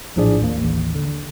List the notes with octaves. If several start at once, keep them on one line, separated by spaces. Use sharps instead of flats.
A#1 A2 F3 D4 G#4 D5
D#2 A#3
A1 D#2
D3